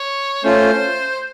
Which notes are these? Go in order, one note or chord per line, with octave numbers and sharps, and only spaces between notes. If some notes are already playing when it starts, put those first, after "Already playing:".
Already playing: C#5
A3 C#4 F4 C5